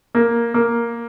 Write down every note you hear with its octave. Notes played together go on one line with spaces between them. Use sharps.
A#3
A#3